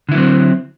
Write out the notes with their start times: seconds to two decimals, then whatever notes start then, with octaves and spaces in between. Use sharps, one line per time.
0.09 D3
0.12 E4
0.15 F#3
0.17 C4